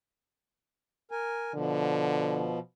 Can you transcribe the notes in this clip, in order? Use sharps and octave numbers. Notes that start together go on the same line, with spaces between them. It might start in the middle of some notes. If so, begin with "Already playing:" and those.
A#4 G#5
B2 D3 F3